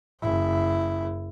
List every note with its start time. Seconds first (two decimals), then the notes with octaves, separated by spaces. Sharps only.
0.21 F#1 E4